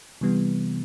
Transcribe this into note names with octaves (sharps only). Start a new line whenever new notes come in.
C3 E3 G3 B3